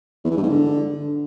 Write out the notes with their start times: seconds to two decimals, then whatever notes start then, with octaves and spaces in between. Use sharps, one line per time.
0.24 E2
0.31 E3
0.37 G2
0.43 G#2
0.49 D3